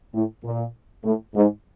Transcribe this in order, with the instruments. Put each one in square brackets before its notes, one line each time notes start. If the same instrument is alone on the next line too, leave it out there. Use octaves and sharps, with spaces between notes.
[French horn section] A2
A#2
A2
G#2